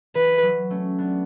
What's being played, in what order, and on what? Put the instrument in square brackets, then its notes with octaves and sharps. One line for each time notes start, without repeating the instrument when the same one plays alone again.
[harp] E3 [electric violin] B4
[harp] F#3
A3 C#4
B3 D4